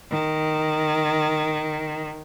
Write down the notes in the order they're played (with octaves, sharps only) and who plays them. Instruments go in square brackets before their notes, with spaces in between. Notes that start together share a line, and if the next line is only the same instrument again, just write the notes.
[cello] D#3